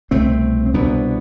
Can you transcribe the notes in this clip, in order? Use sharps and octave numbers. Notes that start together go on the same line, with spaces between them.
C2 B2 A3 C4
C4
C2 B2 B3 D4